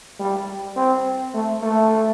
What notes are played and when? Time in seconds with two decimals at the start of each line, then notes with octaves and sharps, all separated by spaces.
0.20 G3
0.76 C4
1.34 A3
1.63 A3